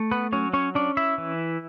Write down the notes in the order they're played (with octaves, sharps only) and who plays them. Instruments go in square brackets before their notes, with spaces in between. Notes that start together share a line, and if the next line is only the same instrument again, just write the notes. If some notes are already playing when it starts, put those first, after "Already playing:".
Already playing: [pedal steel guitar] A3
B3 B4
F#3 C#4 C#5
C#4 C#5
C#4 D4 D5
E4 E5
E3